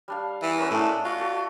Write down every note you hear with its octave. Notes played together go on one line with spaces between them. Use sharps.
G3 D4 F5
E3
B3 C#4 A#4
A2 G#3 A3 D4
F4 F#4 F#5
F#4 A4